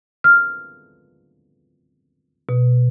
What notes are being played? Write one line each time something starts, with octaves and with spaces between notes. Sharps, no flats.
F6
B2